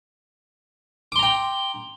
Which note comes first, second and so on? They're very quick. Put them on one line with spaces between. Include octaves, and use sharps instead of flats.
D6 C6 A#5 G5